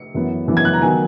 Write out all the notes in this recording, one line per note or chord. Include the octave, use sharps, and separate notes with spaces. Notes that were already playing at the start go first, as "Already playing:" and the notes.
Already playing: C#7
F#2 E3 B3
F#2 E3 B3
G#6
F#6
A#5
D#3 F#3 B3 G#5